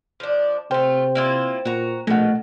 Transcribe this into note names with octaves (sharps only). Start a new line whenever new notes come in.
F3 D4
C3 A3 F4 C5 G5
A#3 E4 F4
A#2 F#4 A#5
A#1 B2 D#3 A3 F#5